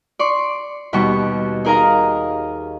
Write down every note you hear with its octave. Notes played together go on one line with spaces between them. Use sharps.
D5 C6 C#6
D#2 B2 G3 F#4 C#6
D#4 G#4 A#4 D#5 F5 A#5